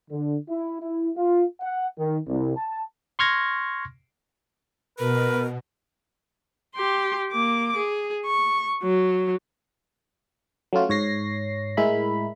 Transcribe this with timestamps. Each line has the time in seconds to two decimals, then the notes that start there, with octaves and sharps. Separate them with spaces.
0.11 D3
0.48 E4
0.81 E4
1.17 F4
1.61 F#5
1.98 D#3
2.27 C2
2.57 A5
3.19 C6 C#6 F6 G#6 A#6
4.99 B2 A#4 B4
6.75 G4 C6
7.32 A#3 D6
7.76 G#4
8.26 C#6
8.83 F#3
10.73 F#3 A3 C#4 F4 F#4
10.89 G#2 C#5 A#6 C7
11.77 A2 G#3 E4 A#4 B5